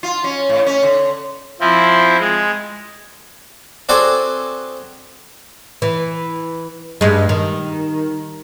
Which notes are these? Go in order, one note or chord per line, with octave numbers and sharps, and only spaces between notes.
F4
C#4
A2
C#4
D3
F3 C4 E4
G#3
C4 F#4 G#4 A4 D5 G#5
E3
G2 G#3
D#3